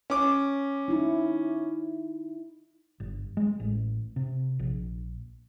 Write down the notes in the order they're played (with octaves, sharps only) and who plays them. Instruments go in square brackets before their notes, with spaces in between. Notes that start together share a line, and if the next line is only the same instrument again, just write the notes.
[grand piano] C#4 D6
[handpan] D#4 E4
[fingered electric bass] G1
G#3
A1
C3
A#1